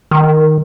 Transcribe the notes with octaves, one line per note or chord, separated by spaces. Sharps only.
D#3